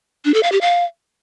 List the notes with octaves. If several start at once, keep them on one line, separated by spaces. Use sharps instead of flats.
D4
A4
F5
G4
F5